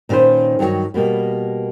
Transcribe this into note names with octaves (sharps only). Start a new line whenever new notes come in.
A#2 D#3 C#4 B4 C5
G2 D#3 F#3 G4 C#5
B2 G3 A#3 B3